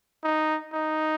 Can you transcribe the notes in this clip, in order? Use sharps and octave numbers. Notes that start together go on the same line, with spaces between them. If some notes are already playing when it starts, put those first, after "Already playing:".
D#4
D#4